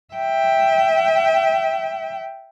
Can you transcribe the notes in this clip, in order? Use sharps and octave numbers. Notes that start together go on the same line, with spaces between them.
E5 G5